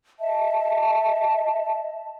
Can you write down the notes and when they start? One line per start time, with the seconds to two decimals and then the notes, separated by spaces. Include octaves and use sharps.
0.20 D#5 E5 A5